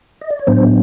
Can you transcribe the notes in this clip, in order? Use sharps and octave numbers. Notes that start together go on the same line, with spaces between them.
D#5
D5
C#5
A2 F#3 B3 D4 C5